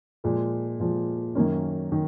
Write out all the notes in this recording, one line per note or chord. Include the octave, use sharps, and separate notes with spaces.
A#2 F3 G#3
A#2 F3 G#3
F#2 D#3 A#3 C#4
D#3